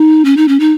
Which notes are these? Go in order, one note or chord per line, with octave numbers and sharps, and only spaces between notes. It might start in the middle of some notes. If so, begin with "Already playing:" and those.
Already playing: D#4
C#4
D#4
C#4
D#4